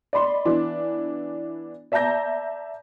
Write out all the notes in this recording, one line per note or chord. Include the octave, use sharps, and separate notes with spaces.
D5 D#5 B5 C6
E3 B3 D4 E4
D5 E5 A5 A#5 G6 A#6